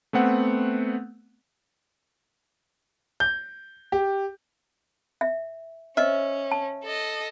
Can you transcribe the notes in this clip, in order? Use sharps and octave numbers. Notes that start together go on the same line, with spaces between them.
A3 B3 C4 F#5
G6
G4
E5
C#4 C5 D#5 E5
A5
A4 D#5